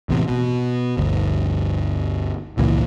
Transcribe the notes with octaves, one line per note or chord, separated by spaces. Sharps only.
A1 E2 C3
B2
G1 D2
G#1 C#2 A#2 E3